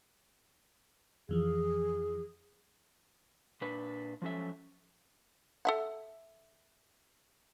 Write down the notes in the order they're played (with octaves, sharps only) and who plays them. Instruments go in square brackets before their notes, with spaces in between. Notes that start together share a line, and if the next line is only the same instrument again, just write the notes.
[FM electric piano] F2 E3 F3 [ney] G#4
[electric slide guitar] A#2 D4 B4
F3 F#3 C#4 A4 E5
[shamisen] A4 E5 F#5